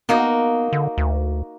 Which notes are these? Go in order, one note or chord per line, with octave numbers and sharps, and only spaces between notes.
A#3 B3 D#4 F#4
D3
D2